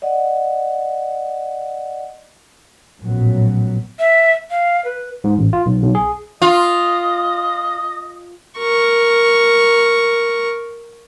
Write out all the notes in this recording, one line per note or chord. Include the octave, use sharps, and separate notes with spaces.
D5 D#5 F#5
A#1 F#2 A2 F#3 B3
E5
F5
B4
G#2
A1
F4
B1
B1
G#4
F4 D#5
A#4 C#6